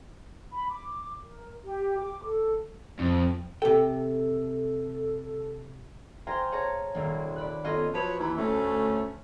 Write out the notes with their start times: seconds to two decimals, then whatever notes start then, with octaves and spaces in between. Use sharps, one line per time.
0.53 B5
0.70 D6
1.23 A#4
1.65 G4
1.99 D6
2.23 A4
2.99 F2
3.62 C3 A4 G5
6.27 C5 F5 G5 G#5 A#5
6.52 G#4 C#5 A5 A#5
6.95 D#1 C2 A#3
7.36 D5 B5 F#6
7.64 B3 C#4 F4 A4 A#4 D#5
7.93 F3 F#3 B4 C#5
8.19 D#2 E3 E4
8.37 D2 A3 C#4